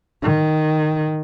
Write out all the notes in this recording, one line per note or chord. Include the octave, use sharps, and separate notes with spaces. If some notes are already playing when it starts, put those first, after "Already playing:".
D#3